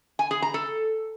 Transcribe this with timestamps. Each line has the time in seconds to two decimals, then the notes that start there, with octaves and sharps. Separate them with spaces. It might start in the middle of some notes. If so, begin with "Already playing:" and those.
0.19 G#5
0.31 G#4
0.42 A#5
0.54 A4